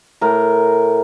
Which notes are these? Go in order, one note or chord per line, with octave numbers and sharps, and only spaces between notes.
A2 A#4